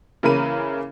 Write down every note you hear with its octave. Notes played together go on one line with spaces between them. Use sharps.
C#3 E3 A#3 A#4 B5 D#7